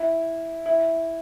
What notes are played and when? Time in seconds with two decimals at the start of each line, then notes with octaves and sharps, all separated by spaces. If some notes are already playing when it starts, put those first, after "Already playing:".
Already playing: E4
0.66 E4